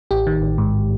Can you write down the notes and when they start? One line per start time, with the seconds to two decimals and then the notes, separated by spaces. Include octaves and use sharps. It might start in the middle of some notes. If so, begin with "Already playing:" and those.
0.11 A1 G4
0.27 D#3
0.42 A1
0.58 G#2